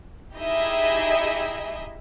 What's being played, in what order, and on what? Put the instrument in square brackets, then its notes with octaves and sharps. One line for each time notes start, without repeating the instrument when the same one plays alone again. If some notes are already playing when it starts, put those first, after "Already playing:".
[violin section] D#4 E4 G4 G#4 D#5 E5